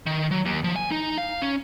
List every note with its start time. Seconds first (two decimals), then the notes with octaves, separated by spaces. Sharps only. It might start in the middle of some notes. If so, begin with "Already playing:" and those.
0.06 D#3
0.31 F#3
0.46 D#2
0.64 F3
0.76 G#5
0.91 D#4
1.18 F5
1.42 C#4